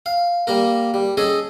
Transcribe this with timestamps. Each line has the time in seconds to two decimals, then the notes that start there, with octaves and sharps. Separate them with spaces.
0.06 F5
0.47 G3 A#3 A#4
0.94 G3
1.17 C#4 G#4 A4 D#5